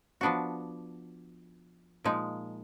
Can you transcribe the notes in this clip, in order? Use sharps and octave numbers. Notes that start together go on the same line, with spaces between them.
F3 B3 D4 F#4
A#2 F3 G#3 D#4